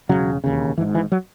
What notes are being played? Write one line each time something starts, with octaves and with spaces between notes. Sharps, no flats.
E1 D#2 C#3 F#3
E1 D#2 C#3
G#1 G#2 E3
E3
F#3